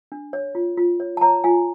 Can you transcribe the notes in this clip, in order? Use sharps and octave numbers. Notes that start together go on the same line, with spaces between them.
D4
C#5
F4
F4
C#5
A5
C#5 A#5
F4 G#5